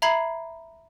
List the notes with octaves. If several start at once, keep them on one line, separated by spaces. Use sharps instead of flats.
E5 A#5 B5 G#6 C7 F#7